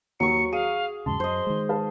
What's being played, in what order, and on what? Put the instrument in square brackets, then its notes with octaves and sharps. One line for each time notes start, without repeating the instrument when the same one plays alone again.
[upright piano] D#2 [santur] F#3 C#6 [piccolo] C#7
[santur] G#4 [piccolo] F5 [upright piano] D#7
[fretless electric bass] E2 G#2 C#3 [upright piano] A5 [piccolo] C6
[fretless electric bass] F#2 [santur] C5 D#5
[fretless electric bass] D#3 G#3
[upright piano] B4 F5 A5